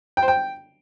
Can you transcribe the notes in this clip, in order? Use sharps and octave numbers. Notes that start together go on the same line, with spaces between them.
G5
C5
G5